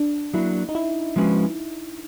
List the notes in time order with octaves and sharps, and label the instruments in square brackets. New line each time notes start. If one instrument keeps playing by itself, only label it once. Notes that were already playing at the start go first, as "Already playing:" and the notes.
Already playing: [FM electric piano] D4
[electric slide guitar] F#3 A#3 D4 [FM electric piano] E4
[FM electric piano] D#4
E4
[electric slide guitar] F3 G#3 C#4 F#4 B4